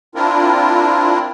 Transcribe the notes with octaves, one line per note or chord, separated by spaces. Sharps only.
C4 D4 E4 F4 A#4